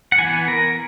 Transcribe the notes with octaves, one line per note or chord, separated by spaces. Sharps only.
F#5
E3 B3 G#5
A#4